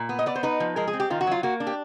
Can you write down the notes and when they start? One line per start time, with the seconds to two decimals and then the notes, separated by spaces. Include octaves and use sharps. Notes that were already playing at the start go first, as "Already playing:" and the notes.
Already playing: A#2
0.09 B3
0.19 D#5
0.26 B3 D5
0.35 C5
0.43 D#4 B4
0.60 F3
0.76 G#3 A#4
0.87 G#4
0.93 C4
1.00 G4
1.10 D#3 F4
1.21 F#4
1.27 F#3 F4
1.43 A#3 F#4
1.60 D4
1.67 G4